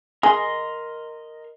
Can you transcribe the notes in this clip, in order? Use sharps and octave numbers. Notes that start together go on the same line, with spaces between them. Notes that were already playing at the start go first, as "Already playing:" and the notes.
G#4 A#4 D#5 C6